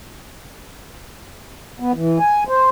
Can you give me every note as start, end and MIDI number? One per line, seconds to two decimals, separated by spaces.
1.80 1.92 59
1.95 2.18 52
2.20 2.44 80
2.49 2.70 72